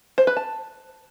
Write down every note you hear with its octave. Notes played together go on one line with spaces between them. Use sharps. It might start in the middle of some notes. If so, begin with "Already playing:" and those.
C5
B4
A5